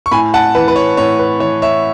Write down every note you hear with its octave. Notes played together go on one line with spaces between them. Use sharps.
C#6
A2 G#5 B5
F#5 A5
E3 B4
B4
C#5
A2 C#5
B4
E3 C#5
C#5 E5